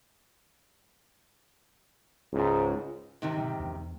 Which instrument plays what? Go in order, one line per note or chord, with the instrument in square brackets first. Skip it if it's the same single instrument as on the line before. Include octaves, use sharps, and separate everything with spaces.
[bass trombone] C#2 [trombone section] G#2
[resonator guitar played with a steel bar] G#2 C3 D#3
[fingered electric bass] B2 D3 F#3
E2 G#3 D4